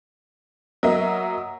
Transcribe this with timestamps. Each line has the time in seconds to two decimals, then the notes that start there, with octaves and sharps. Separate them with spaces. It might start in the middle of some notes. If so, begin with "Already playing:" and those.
0.83 F#3 A#3 D#5 E5